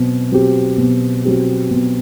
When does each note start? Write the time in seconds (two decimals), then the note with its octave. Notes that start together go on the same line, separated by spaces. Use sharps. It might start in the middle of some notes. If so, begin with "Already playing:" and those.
Already playing: B2 F#3 C4
0.32 F#3 C4 G4
0.78 B2
1.25 F#3 C4 G4
1.71 B2